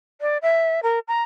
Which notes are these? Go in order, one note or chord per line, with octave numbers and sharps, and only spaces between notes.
D5
E5
A#4
A#5